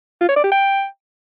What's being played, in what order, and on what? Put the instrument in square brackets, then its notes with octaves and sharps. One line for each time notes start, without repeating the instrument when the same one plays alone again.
[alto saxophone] F4
C#5
D5
G4
G5